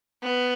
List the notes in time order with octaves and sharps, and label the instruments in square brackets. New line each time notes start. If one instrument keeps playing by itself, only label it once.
[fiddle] B3